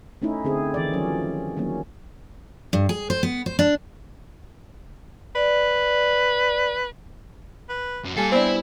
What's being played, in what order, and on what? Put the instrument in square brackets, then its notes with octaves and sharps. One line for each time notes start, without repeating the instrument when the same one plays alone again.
[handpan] A3 C#4 D#4 E4
D3 C4 G#4
D#3 E3 D5
F3 F#3 C#4
D#3 F#3 A#3 C#4
[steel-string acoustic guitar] G2
G#4
C5
B3
C5
D4
[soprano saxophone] B4 [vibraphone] D5
[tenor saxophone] B4
[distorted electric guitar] F#2
[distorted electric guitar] A#2 F5 [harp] G3 G#5 [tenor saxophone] A4
[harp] B3 D4 [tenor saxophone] C4 [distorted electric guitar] E4 [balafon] C5 D5